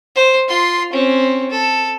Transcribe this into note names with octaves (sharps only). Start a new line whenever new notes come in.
C5
F4 C6
C4 C#4
A4